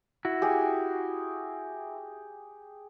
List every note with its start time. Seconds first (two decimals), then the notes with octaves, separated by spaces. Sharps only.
0.25 E4 F#4
0.42 G4 G#4 G#5